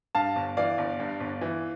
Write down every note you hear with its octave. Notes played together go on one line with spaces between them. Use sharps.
G2 F5 A5
G1
E3 D5 F5
G1
G2
G1
E3